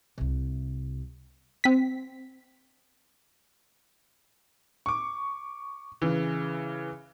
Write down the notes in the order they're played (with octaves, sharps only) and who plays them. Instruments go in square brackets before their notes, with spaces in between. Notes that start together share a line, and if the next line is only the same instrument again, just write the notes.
[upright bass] C2 C3
[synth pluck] C4 B6
[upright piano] C#6 D6
C#3 E3